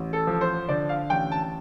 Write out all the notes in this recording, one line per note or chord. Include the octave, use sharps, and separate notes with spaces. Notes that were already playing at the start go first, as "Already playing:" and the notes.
Already playing: A1
A4
F3
C5
D3 D5
F5
A1 G5
A5
A5